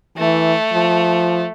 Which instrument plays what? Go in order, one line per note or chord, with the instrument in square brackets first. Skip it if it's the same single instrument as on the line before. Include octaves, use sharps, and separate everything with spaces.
[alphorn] E3 [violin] A3
[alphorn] F3